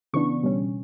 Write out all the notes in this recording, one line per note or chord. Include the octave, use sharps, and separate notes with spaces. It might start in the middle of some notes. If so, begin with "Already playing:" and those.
C#3 E3 B3 D4 C#6
B2 G3 C#4